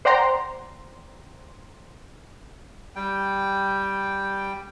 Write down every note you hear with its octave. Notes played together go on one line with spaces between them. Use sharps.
C5 D5 F#5 G5 A#5 C6
G3 G5